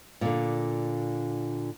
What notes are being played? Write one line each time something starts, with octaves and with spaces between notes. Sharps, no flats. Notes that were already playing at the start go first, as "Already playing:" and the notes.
A#2 D3